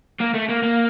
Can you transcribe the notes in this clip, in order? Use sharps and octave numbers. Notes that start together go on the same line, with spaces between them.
A#3
A3
A#3
A#3